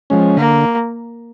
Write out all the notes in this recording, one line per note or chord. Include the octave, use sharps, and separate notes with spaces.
F3 G#3 C#4
D3 A#3